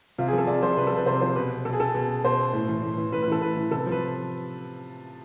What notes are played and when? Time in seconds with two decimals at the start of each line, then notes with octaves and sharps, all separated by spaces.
0.18 C3 F4
0.28 G#4
0.33 F3
0.38 A4
0.47 C3 D5
0.63 F3 C5
0.77 C3 B4
0.87 A4
0.92 F3
0.97 B4
1.06 C3 C5
1.21 F3 C5
1.35 B2 B4
1.65 B2 A4
1.73 G#4
1.80 A4
1.95 B2
2.25 B2 C5
2.53 A2
2.69 E3
2.83 A2
2.97 E3
3.12 A2 B4
3.23 B4
3.28 E3 A4
3.42 A2 B4
3.57 E3
3.71 C3 A4
3.86 F3
3.92 B4